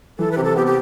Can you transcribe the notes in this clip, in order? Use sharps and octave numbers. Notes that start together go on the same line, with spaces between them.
E3 A4
B4
C3 G4
A4
B3 G4
G4